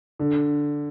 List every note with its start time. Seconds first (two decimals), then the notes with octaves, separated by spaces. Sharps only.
0.19 D3